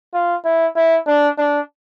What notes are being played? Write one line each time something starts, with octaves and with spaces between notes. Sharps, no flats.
F4
E4
E4
D4
D4